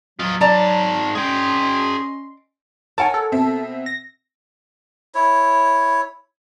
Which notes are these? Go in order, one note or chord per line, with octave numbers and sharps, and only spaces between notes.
F#3 F4 D#5
G#2 D5 A5 A#5
C#4 G#4 D#5 G5 C6
A#4 C#5 F#5 G#5 A5
A4
B2 C4 E5
A#6
E4 C#5